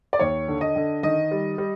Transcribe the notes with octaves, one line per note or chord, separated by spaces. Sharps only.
D5
D#2 C#5
D3
D#5
D3
D#3 D#5
G3
G3